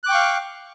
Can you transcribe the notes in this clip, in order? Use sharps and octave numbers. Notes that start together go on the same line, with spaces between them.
F5 G5 C#6 D6 F#6